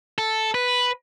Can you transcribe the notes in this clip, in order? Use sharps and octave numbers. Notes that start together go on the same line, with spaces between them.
A4
B4